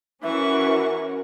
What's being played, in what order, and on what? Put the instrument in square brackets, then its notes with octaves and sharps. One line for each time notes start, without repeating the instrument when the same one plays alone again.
[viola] E3 C#6 [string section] C#4 F#4 A#4 [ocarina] E5